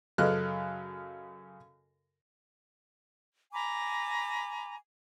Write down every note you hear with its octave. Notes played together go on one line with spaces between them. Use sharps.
F#2 C#3 A4 D#5 F6 F#6
G#5 A#5 B5 D6